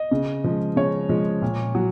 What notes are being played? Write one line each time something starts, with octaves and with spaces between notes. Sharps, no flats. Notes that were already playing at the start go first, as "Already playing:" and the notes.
Already playing: D#5
C#3
F3 G#3
C#3 C#5
F3 G#3
A#2
F#3